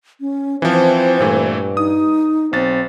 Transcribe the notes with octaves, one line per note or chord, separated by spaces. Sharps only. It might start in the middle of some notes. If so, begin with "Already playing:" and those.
C#4
E3 F3 C4 C5
G2 A#2 E3 A3
D#4 D#6
B1 C4 A6